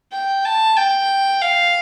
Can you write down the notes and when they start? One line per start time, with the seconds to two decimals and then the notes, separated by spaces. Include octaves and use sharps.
0.12 G5
0.45 A5
0.77 G5
1.42 F5